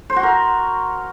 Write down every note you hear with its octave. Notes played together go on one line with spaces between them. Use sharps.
C5
F#4
A#4